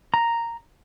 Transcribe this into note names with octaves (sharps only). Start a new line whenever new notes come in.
A#5